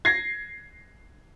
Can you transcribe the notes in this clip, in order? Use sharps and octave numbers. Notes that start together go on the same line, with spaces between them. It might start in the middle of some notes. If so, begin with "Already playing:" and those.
G#6 A#6 C7